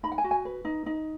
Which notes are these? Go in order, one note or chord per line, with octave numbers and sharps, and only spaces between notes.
D#4 B5
F#5
G#5
F#4
G#5
B4
D#4
D#4